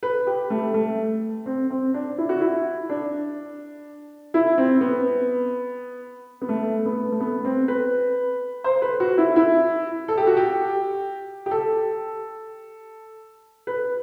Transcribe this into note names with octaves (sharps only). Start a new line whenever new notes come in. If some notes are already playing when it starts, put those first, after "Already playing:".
B4
G4
A3
A3
C4
C4
D4
E4
F#4
E4
D4
E4
C4
B3
B3
A3
B3
A3
B3
C4
B4
C5
B4
F#4
E4
E4
A4
G4
F#4
G4
G4
A4
B4